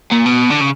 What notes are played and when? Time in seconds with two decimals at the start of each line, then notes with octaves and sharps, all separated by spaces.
0.12 A#2
0.26 B2
0.50 D3
0.61 C#3